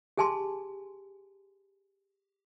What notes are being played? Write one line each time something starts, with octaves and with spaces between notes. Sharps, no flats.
G4 G#4 G#5 A5 C6